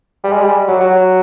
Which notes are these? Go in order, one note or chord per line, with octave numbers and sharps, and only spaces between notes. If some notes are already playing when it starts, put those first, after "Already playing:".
G3
G#3
G3
F#3
F#3